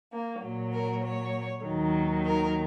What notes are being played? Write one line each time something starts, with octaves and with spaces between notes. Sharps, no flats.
A#3
A#2 F#3
A#4
C#5
D#2 D#3 F#3
A#4